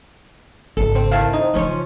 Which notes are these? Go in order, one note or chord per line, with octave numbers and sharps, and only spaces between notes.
G#1 C#3 A4
C4
D#3 C4 E4 F5 A5
D#4
C#3 E3 F3 C#4 C#5